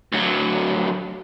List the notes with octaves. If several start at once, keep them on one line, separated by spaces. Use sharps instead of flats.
D2 F#3